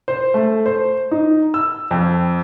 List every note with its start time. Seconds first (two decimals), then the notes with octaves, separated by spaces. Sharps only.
0.08 C5
0.34 A3
0.66 C5
1.11 D#4
1.54 E6
1.91 F2